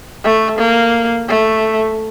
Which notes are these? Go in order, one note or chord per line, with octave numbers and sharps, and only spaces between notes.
A3
A#3
A3